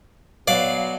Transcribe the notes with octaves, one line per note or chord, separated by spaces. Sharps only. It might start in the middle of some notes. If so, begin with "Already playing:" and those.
B2 F#3 D5 F5